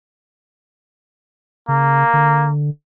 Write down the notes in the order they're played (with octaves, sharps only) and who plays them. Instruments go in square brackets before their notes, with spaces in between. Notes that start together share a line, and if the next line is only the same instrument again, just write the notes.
[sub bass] C#3 [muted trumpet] A#3
[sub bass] D3